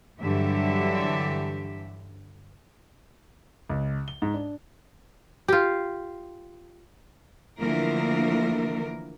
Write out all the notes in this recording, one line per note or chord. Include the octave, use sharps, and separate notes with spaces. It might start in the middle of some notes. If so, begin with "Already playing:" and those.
G2 D3 E3 F#3 G4 E5
C#2
G7
G#2
D4
F4 G4
D3 E3 F3 A3 A#3 A#4